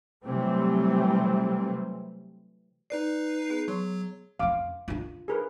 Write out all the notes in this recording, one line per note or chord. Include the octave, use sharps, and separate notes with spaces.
C3 E3 F#3 G3 A3 C4
D#4 B4 D5 C7
B3 G#4
F#3 C#5 C6 C#6
F2 C#4 F5 D6
D4 F4
G#4 A#4 B4